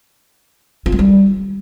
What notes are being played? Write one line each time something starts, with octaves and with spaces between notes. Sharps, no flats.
F4
A3
G3